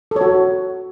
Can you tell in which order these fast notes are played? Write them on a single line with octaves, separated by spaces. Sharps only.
A4 C#5 F#4